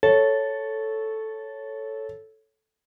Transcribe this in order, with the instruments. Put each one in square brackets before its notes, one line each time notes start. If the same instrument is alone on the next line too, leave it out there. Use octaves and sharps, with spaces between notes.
[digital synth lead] A4 [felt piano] C#5